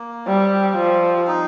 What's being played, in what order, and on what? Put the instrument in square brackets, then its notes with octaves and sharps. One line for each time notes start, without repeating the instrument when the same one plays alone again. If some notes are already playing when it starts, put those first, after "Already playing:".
Already playing: [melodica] A#3
[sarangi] G3 [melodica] C4
[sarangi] F3
[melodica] D#4